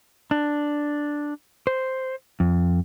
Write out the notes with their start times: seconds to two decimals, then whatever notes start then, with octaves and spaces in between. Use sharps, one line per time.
0.31 D4
1.67 C5
2.40 F2